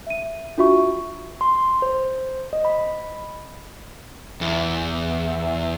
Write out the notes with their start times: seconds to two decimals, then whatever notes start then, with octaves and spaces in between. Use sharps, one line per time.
0.07 E5 D#7
0.58 D4 F4 F#4 E5 C#6
1.41 C6
1.82 C5
2.53 D#5
2.65 B5
4.41 E2